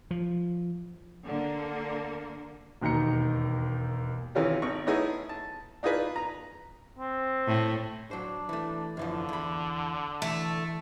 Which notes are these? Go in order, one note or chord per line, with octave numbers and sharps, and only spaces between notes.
F3
D3 A#3
E1 D#2 D#3 A#5 C#7
C3 D#3 E3 C#4 F4 G4
G#1 D#4 C#6
A3 B3 C#4 D#4 E4 G#4
A5
D4 D#4 F4 G#4 B4
A#5
C4
A2
F#3 D4 C5
E3 A3
F#2 D3 E3 F3
E2 B5
E3 A3